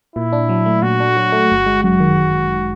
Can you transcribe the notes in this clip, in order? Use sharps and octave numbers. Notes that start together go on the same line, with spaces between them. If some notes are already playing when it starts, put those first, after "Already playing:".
A#2 E4
D4
F#3
A3
A#2 F#4
D4
F#3
A3
G1
G#3
F#2 F#4
D#3